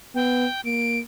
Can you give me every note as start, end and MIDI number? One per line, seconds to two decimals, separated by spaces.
0.15 0.46 59
0.15 0.61 79
0.65 1.01 58
0.65 0.99 98